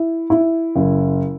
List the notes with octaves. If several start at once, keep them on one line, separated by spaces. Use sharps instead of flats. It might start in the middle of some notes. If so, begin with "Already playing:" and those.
Already playing: E4
E4
F#1